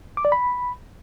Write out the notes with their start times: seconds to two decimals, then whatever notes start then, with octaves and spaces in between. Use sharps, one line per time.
0.17 D6
0.25 D5
0.32 B5